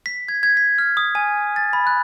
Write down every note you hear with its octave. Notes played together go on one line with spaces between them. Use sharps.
B6
G#6
G#6
B6
F6
D#6
G#5
A6
B5
F#6